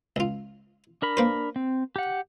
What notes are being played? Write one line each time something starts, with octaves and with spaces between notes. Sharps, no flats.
C#2 F4
D4 A#4 B5
A#3 B4 C5
C4
G4 F#5